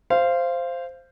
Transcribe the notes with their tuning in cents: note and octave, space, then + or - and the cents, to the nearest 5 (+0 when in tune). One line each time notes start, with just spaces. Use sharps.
C5 +0 F5 -20